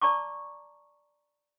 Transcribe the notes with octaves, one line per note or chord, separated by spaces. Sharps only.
D5 A5 A#5 C#6 D6